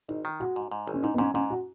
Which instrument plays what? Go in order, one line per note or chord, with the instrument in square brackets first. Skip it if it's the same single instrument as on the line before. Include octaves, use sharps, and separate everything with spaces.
[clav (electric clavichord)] G#1 [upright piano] D#4
[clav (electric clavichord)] D#3
[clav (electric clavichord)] G#3 [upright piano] F#4
[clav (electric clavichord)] G#2
G#2
G#1
[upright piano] C#4
[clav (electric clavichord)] G#2 [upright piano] D#4
[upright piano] B3
[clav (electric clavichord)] G#2 [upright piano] C#4
[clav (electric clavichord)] G#2 [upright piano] C#4
[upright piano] F#4